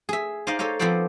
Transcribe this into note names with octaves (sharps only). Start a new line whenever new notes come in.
G#4 E5
D#4 C5 D5 D#5 F5
A4 C5 C#5 D#5 F5
F3 B3 C4 A4 C5 D5